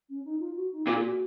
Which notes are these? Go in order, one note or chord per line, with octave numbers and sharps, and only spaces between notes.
C#4
D#4
F4
F#4
D#4
A#2 F4
G#4
F#4